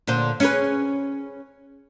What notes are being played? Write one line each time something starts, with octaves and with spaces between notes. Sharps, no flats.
A#2 D3 C5
C#4 G#4 B4